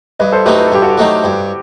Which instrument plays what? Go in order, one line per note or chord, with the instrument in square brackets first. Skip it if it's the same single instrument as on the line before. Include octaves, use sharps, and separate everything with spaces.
[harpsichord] G2 [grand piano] B4 D#5
[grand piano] A4 C5
[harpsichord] F#3 A3 D#4 [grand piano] G4 B4
[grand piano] B4
A4
[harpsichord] G2 [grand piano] G4
[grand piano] F#4 A4
[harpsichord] F#3 A3 D#4
G2